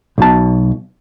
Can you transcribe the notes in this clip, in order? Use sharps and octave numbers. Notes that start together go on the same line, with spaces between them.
B1 B2 A5